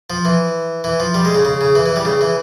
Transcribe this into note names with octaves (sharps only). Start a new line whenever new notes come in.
F3
E3
E3
F3
G3
G#3
C#3
C#3
C#3
E3
E3
G3
C#3
E3